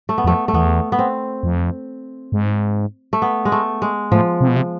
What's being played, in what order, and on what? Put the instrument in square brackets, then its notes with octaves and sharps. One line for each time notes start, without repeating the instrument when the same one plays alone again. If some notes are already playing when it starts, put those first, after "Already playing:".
[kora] A3
B3
[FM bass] F2 [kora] A3
[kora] A3
[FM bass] E2 [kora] B3
[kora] B3
C4
[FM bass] F2
G#2
[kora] A3
B3
G#3
A3
G#3
[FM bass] A2 [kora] F3
[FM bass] C3
B2
C3